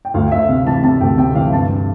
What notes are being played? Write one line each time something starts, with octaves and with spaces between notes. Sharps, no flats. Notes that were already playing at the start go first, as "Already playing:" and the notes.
G5
D2 F5
D2 E5
C3 F5
E3 A5
C3 A5
D2 G5
C3 G5
E3 F5
G2 A5